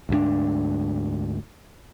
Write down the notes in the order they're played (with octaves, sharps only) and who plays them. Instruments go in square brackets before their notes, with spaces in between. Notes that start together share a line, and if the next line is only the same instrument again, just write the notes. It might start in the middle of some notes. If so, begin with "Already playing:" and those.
[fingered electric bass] D2 G#2 G3 D4